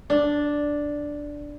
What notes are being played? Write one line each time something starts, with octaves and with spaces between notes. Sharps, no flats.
D4